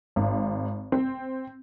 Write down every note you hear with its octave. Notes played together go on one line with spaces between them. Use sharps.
G#1
C4